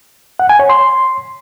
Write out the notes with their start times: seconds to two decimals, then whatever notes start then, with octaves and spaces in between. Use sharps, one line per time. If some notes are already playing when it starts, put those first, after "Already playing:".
0.39 F#5
0.49 G#5
0.59 C#5
0.69 C6